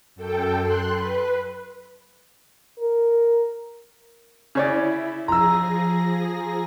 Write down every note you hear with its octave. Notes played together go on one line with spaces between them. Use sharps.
F#2 A4 G5
C6 F#6
B4
A#4
C#3 E4 C#5 D5
F3 G#4 A#5 E6 A#6